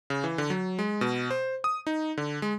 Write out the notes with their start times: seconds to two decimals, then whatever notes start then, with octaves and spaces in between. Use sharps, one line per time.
0.10 C#3
0.24 E3
0.38 D3
0.50 F#3
0.79 G#3
1.01 B2
1.30 C5
1.64 D#6
1.87 D#4
2.17 D3
2.42 G#3